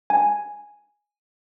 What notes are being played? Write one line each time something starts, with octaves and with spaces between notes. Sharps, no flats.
G#5